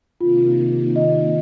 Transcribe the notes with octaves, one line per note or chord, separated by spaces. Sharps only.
C3 D#3 A#3 F4
D#5